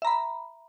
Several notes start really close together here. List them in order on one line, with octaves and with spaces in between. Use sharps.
E5 A#5 B5